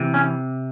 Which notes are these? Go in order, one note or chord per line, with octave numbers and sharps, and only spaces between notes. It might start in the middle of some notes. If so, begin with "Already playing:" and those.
Already playing: C3 E3
C#4